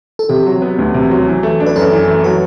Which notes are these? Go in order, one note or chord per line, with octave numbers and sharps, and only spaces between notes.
A4
C3 G4
F#3
B3
D2
C3
F#3
E3
A3
D4
B4
F#2 A4
E3
A3
F#3 B4